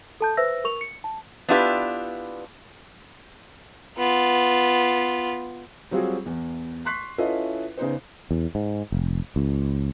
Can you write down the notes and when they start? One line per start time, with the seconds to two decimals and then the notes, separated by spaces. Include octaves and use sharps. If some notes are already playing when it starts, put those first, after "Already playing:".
0.21 A4 A5 G6
0.37 B4 C5 E5 E6 A#6
0.64 A#4 C#6 F7
0.81 C#7
1.04 A5
1.48 B3 D4 E4 F4 G4 B4
3.98 B3 F4
5.91 F#3 G3 C4 F4 F#4 G#4
6.26 E2
6.85 C6 C#6 F#6 B6 C7
7.18 C#4 E4 F4 A4 B4 D#5
7.77 C#3 B3 D#4 C5
8.31 E2
8.55 G#2
8.92 F1
9.36 C#2